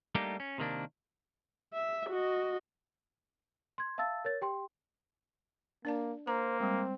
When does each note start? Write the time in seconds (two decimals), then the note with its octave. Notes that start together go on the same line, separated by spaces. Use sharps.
0.15 G3 A3 A#3 D4 D#4 G4
0.40 C#4
0.58 C3 D#3 A#3 D4
1.74 E5
2.10 F#4 D#5
3.78 C6 G#6
3.98 E5 F5 A5 E6 A6
4.25 A#4 C#5 A6
4.42 G4 G5 C6
5.85 A#3 D4 D5 A5
6.27 A#3 C5 A#5
6.60 G3 G#3 C4